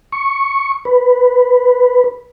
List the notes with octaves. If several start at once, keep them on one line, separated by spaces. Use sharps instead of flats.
C#6
B4